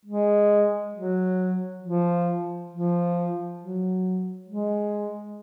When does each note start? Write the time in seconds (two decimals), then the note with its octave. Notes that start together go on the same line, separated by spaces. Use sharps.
0.05 G#3
0.93 F#3
1.82 F3
2.70 F3
3.59 F#3
4.47 G#3